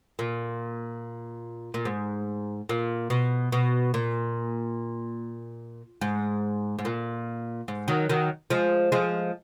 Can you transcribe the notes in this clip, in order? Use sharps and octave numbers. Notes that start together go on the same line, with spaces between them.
A#2
A#2
G#2
A#2
B2
B2
A#2
G#2
G#2
A#2
G#2
D#3 F#3
D#3 F#3
F3 G#3
F3 G#3